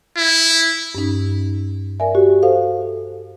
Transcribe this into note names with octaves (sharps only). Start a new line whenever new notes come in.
E4
G2 C#4 D#4
A#4 D5 E5 G#5
F#4 G4
A4 C5 F5